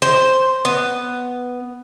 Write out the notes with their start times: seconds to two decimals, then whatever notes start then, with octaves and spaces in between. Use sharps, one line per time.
0.02 C5
0.65 B3